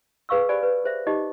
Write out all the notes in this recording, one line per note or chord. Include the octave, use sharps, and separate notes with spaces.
G#4 B4 F5 C#6 E6
G4 C5 D5 G#5 B5
B4
G#4 C5 E5
D#4 G4 D#5 D6